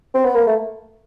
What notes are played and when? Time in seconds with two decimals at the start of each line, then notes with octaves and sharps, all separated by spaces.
0.14 C4
0.25 B3
0.35 A#3
0.47 A3